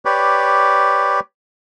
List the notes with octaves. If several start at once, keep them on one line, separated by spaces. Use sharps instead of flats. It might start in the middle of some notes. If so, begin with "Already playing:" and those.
G4 B4 C#5 D5